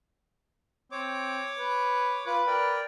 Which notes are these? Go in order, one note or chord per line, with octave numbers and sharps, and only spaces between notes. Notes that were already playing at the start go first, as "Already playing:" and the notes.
C4 C#5 D6
B4
F4 B4 D6
A#4 D5 G5